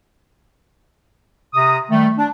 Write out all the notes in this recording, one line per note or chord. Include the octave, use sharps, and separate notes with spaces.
C3 A#5 D#6
D#3 G3 A3
D4